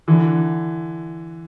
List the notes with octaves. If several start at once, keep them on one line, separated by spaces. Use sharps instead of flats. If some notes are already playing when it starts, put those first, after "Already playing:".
D3 E3